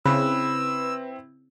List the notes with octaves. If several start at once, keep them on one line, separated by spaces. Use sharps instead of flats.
C#3 C4 E4 B4 E6